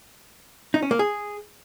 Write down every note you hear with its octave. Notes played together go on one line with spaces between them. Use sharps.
D#4
C#4
A#3
G#4